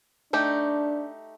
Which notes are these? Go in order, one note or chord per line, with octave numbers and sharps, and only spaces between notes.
A3 D4 D#4 G4